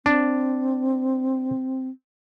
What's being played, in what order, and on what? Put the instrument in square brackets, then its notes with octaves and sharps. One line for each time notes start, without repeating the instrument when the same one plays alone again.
[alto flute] C4 [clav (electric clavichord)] D4